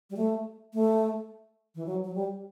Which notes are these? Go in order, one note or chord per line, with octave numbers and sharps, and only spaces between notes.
G3
A3
A3
E3
F#3
F#3
G3